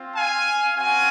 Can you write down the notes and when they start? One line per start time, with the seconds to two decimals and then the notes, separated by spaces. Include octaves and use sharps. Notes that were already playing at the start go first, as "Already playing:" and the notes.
Already playing: C4 F4
0.14 F5 G#5
0.75 C4 F#4 F5 G#5